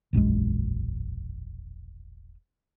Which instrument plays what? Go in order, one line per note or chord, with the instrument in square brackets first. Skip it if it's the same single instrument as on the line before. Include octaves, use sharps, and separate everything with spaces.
[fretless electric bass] E1 A#1 F#2 G#3